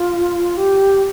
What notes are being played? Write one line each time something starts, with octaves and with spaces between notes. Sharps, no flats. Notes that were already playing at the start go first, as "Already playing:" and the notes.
Already playing: F4
G4